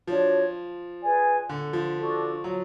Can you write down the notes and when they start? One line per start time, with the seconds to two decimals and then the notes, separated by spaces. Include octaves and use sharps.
0.07 F3 D4 F#4 C#5
1.01 G#4 B4 D5 G#5
1.49 D3
1.73 F3
1.97 D4 F#4 A4
2.44 F#3